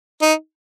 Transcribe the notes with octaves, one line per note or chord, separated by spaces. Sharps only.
D#4